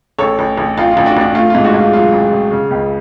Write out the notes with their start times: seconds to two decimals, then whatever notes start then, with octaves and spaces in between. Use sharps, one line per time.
0.18 A1 A4 C#5
0.39 A1
0.58 A1
0.77 A1 F4
0.91 F4
0.97 A1
1.06 D4 F#4
1.16 A1 D4
1.35 A3 F4
1.50 G#2 F4
1.64 D4 F#4
1.74 G#2 F4
1.93 F#3 F4
2.12 A1
2.32 A1
2.51 C#3
2.71 C#2